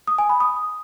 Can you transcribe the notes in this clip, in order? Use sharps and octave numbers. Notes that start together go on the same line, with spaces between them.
D#6
G#5
B5
D#6